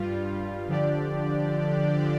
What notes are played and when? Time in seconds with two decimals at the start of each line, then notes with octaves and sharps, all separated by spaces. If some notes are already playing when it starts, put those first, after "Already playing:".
Already playing: G2 G3 F4
0.69 D3 F3 D4 G4 D5